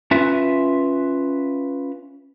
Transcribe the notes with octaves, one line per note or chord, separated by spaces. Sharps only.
C#4 F4 B4 E5